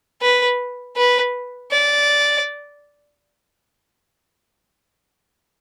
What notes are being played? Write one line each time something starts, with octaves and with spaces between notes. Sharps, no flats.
B4
B4
D5